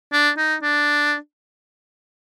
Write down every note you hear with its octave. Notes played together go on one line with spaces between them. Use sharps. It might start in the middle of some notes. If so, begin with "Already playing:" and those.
D4
D#4
D4